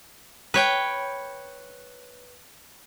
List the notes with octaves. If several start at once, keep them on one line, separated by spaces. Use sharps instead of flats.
B4 C#5 G5